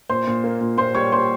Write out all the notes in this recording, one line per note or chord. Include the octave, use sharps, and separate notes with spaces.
A#2 C5 C6
A#2
A#3
A#2
A#2 C5 C6
G3 C#5 C#6
A#2 C5 C6